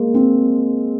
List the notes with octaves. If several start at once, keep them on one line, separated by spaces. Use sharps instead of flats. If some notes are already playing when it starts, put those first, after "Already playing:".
Already playing: G#3 A#3
C4